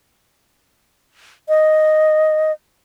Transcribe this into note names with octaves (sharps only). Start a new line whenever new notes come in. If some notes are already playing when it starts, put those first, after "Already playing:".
D#5